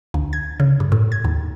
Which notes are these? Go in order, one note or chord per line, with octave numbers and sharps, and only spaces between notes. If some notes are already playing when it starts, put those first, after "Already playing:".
D2
G#6
C#3
G2
A2
G#6
D#2